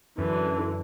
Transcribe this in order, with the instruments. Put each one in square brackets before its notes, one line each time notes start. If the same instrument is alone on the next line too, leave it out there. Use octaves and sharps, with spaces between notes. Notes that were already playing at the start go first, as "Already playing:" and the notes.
[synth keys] F#2 [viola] D3 E3